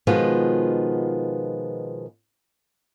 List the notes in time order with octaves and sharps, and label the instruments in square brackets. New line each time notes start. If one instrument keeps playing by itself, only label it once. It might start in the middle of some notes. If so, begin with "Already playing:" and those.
[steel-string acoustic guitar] B2 D#3 F3 G#3 B3 F4